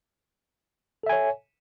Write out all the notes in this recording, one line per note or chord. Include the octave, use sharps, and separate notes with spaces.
A4 C#5 E5 G#5